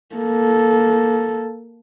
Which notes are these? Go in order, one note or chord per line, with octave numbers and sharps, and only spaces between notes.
A#3 A4